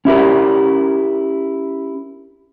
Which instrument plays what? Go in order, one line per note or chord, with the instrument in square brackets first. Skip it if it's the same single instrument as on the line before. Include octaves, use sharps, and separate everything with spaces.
[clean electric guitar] C#4 E4 G4 A#4